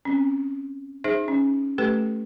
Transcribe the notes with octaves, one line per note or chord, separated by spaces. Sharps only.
C4 C#4
D#4 G#4 C5 E5
C#4
A3 G4 A4 B4